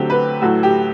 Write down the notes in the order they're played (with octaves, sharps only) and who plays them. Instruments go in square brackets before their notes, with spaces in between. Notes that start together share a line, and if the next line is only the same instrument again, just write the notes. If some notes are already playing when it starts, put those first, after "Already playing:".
Already playing: [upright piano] D3 F#3 A3 C4 G4
B4
A2 F#3 A3 F#4
G4